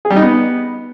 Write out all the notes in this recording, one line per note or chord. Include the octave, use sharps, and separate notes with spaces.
G#4
G3
D#4
B3